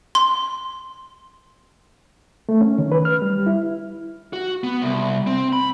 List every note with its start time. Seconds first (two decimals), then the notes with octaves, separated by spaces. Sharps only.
0.15 C6
2.49 A3
2.61 C#4
2.78 D#3
2.92 B4
3.05 F6
3.22 G3
3.46 E4
4.33 F#4
4.64 B3
4.82 C2
5.27 C4
5.53 B5